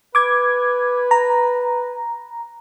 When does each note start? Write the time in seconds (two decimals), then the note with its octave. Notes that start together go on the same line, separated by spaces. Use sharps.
0.15 B4 D6 G#6
1.11 A#5